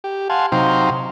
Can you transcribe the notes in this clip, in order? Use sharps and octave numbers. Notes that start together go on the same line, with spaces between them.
G4
F5 F#5 G#5 A5 C6
C3 F#3 D#4 C5 F5 G5